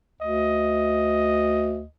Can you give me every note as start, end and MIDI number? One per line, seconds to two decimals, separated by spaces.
0.21 1.84 38
0.21 1.87 75